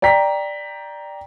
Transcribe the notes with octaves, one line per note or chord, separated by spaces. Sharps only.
D5 G5 A#5 B6